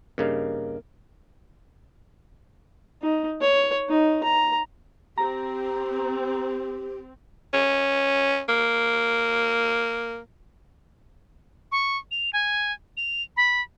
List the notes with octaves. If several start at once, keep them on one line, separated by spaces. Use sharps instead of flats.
G2 C#3 A#3 D#4
D#4
C#5
D#4
A#5
C4 G4 A#5
C#4
A#3
C#6
F7
G#5
F7
B5